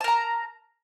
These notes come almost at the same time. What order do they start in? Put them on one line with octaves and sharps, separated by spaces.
A5 A#4 A#5